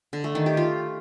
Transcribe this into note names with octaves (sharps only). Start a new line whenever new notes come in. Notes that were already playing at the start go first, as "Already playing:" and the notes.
D3
A3
D#3
G4
F4